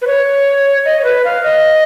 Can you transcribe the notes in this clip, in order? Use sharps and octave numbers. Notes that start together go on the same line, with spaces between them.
B4
C#5
D#5
C#5
B4
F5
D#5